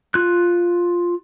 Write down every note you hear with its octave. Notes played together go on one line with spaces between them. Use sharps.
F4 F#6